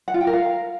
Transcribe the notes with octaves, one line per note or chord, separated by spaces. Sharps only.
F#5
F4
G5
A#4
F5